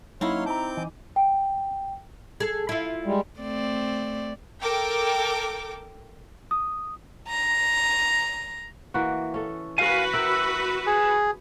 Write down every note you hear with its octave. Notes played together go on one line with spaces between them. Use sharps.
F#3 A#3 C#4 D#4 E4 C#5 F5 C6
C4 A5 A#5 D6 G6
E3 D#5
G5
G#4 A4
E4 F4
G3 G#3
A3 C4 D5
A4 A#4 G5 D6
D#6
A#5 A#6
E3 A#3 F#4
C#4 A4
F#4 A#4 B4 F5 G#5
E4 A#4 G5 E6
G#4